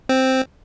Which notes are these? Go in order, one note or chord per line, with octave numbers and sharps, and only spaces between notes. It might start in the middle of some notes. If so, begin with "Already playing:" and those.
C4